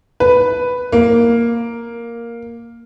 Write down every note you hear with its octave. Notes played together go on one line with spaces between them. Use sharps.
B4
A#3